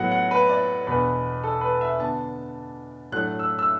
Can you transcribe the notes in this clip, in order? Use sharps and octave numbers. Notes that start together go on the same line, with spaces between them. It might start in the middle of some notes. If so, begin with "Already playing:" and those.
Already playing: A2 F#3 B3 F#5
F#5
B4
D5
E2 B2 B3 D4 B4
A4
B4
E5
D3 B3 D4 A5
A2 F#3 A3 D4 F#6
E6
E6